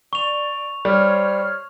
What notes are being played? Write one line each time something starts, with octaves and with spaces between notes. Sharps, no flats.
D5 C#6 F7
G3 C5 C#5 F6